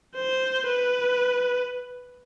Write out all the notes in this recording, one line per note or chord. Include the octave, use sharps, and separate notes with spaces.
C5
B4